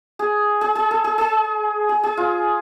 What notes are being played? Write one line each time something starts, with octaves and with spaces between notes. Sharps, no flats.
G#4
G#4
G#4
A4
G#4
G#4
G#4
G#4
F4